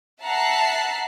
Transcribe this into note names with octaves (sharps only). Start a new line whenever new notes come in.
E5 F#5 A5 A#5 F#6 C7